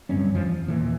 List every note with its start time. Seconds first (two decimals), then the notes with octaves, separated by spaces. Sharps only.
0.09 D1 G2 C4 C#4
0.30 F2 F3
0.43 E2
0.68 D#2 A#2 E3